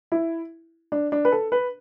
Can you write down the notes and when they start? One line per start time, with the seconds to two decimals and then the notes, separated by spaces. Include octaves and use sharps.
0.12 E4
0.92 D4
1.12 D4
1.25 B4
1.32 A4
1.52 B4